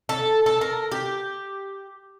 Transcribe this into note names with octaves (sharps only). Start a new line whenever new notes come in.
A4
A4
A#4
G4